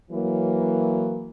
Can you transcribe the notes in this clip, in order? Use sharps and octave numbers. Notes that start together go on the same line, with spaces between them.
E3 F#3 A#3